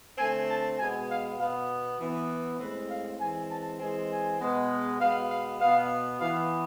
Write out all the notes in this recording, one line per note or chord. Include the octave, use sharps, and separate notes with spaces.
D3 A3 C4 G#5
A5
B2 G#3 B3 G#5
F5
B2 B3 F5
E3 B3
A2 G#3 C4 B4
F5
E3 G#3 C4 G#5
A5
E3 G#3 C4 G#5
G#5
B2 G#3 B3
B2 G#3 B3 F5
F5
B2 B3 F5
E3 B3 F5